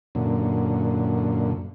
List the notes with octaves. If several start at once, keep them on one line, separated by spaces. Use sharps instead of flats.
F#2 A#2 D3